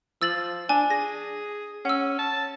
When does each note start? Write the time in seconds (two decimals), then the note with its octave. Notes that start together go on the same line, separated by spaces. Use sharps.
0.22 F3 E6 A6 F#7
0.69 D4 G#5
0.90 G#4 A#6
1.85 C#4 F#5 E6
2.19 A5